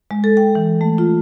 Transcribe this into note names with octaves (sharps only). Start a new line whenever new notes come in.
G#3
A4
G5
E3
A3
F4